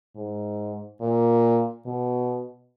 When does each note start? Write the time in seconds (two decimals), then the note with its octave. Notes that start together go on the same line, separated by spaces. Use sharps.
0.16 G#2
1.01 A#2
1.86 B2